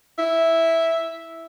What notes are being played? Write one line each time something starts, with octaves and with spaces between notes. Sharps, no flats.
E4